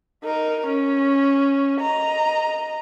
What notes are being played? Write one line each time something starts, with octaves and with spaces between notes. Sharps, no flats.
D#4 A#4
C#4
D#5 A#5